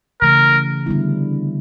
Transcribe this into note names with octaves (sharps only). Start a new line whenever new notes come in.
C#3 E3 A3 A#4
D3 G3 B3 E4